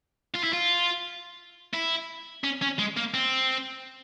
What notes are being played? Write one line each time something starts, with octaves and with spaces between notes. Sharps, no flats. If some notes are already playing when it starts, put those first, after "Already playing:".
F4
E4
F4
E4
C#4
C#4
G#3
A#3
C4